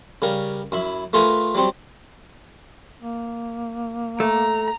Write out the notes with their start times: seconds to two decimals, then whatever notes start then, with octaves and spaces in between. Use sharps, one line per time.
0.22 C#3 G3 A#4
0.72 F#2 E4 B5
1.13 A3 F4 G#4 A#4 B4
1.55 F#3 G3 C4
3.02 A#3
4.20 A3 A#5